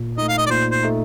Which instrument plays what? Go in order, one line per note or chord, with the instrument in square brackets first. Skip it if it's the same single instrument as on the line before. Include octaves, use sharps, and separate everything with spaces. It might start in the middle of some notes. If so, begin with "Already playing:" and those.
Already playing: [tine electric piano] A#2
[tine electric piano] A3 D#4 [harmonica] D#5
[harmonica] F5
D#5
D5
[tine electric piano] A#2 [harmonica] C5
[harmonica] C5
[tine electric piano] A3 D#4